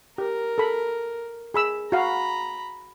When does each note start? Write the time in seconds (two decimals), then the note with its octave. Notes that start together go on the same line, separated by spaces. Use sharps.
0.18 G4 A#4
0.58 A4 B5
1.54 G#4 B5 E6
1.92 F#4 F5 A#5 B5